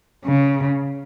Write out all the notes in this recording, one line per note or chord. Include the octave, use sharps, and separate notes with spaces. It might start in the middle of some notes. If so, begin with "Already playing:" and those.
C#3